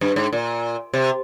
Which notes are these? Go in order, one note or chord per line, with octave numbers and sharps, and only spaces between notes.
G2
G#2
A#2
C3